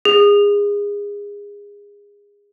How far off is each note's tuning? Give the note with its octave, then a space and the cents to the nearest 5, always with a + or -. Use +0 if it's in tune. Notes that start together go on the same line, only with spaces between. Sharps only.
G#4 -25